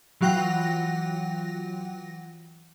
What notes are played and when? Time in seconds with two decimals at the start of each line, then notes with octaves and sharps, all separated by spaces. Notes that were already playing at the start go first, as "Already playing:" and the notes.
0.21 E3 F#3 F4 F#5 G5 A#6